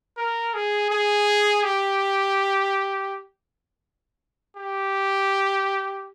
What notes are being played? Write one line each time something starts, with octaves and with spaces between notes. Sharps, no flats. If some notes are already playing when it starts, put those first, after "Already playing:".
A#4
G#4
G#4
G4
G4